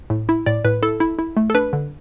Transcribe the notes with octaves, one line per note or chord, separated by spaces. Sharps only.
A2
E4
A2 D5
A2 B4
E4 A4
E4
E4
A3
A4
D4 B4
D3